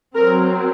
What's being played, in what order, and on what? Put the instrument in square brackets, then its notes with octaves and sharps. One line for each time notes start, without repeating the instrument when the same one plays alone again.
[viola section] F#3 C4 A#4